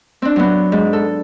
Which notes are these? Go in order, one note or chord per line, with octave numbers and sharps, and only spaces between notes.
C4 D4
F#3 B3
G#2
A4